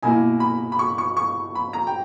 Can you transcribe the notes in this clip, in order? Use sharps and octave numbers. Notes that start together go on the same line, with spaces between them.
B2 A#3 E4 G#5
B5
B5
C#6
C#6
C#6
B5
A#5
G5